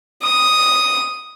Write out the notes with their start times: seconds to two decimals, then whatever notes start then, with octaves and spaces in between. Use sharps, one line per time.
0.23 D#6